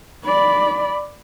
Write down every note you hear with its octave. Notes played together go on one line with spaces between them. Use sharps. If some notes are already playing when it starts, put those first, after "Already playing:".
D5 B5